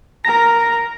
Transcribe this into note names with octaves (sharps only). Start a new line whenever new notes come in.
A#4 A#6